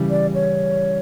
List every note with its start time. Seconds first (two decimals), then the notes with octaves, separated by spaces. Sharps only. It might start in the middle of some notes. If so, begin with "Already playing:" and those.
Already playing: C#3 E3 G3
0.10 D5
0.34 C#5